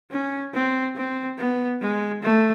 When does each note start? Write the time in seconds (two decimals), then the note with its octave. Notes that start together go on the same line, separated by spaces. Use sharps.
0.11 C#4
0.54 C4
0.96 C4
1.38 B3
1.81 G#3
2.23 A3